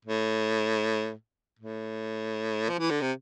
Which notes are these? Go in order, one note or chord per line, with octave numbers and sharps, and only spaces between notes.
A2
A2
F3
E3
D3
C3